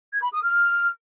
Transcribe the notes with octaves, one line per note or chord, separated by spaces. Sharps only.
G#6
B5
D#6
F6